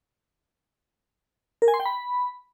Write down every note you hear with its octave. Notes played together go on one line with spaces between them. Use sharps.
A#4
G#5
C6
G5
B5